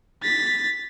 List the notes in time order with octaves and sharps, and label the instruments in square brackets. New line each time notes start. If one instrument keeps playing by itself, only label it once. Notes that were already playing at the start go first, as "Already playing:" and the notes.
[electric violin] A6 B6